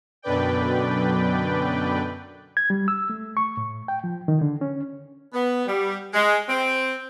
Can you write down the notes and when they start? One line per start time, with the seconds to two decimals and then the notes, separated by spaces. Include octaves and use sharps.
0.22 F#2 B2 D3 B4 D5 G5
2.57 G#6
2.70 G3
2.88 E6
3.10 A3
3.37 C#6
3.57 A2
3.88 G5
4.04 F3
4.28 D#3
4.41 D3
4.61 C#4
5.33 B3
5.66 G3
6.14 G#3
6.49 C4